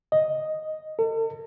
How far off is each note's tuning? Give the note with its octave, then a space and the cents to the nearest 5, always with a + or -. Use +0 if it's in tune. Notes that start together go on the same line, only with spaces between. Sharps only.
D#5 +0
A4 +40